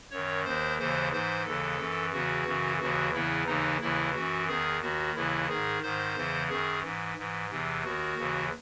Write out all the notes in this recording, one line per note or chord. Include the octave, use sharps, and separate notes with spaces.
F#2 D#3 C#5
D#2 D#3 C5
D#2 C#3 E3 C5
G#2 E3 C5
D#2 C#3 E3 A4
F#2 E3
E2 C#3 E3 F#4
F#2 C#3 E3
D#2 C#3 E3 F#4
E2 C#3 E3 E4
D#2 C#3 E3 D#4
D#2 C#3 E3 E4
F#2 E3 F#4
E2 D#3 G#4
D#2 D#3 F#4
D#2 C#3 E3 E4
G#2 D#3 G#4
G#2 D#3 C5
E2 C#3 E3
F#2 D#3 G#4
G#2 E3
G#2 E3
E2 C3 E3
D#2 D#3 F#4
D#2 C#3 E3